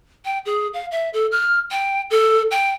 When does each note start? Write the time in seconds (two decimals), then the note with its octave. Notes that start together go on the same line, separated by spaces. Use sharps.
0.25 G5
0.46 G#4
0.74 F5
0.91 E5
1.14 A4
1.32 F6
1.71 G5
2.11 A4
2.51 G5